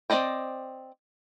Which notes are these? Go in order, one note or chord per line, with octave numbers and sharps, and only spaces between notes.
C4 G#4 D5 D#5 G5